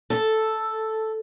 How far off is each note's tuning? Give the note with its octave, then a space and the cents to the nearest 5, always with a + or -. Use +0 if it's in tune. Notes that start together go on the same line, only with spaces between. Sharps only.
A4 +0